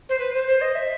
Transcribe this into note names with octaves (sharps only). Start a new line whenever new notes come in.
C5
B4
C5
C5
D#5
E5